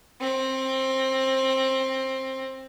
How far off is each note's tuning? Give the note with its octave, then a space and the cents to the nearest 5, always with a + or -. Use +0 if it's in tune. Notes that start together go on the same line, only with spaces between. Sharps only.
C4 +15